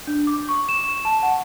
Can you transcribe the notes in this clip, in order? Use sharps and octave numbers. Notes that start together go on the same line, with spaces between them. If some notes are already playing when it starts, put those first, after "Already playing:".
D4
D6
C#6
E7
A5
F#5